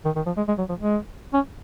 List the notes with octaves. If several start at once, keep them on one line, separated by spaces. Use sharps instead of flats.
D#3
D#3
F3
G#3
G#3
F#3
F3
G#3
C#4